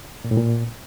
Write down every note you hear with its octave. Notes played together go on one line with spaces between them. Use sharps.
A#2
A2
A#2